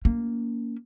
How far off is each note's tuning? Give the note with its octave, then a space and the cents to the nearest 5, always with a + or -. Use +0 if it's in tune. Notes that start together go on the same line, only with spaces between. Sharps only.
A#3 +0 C#4 +35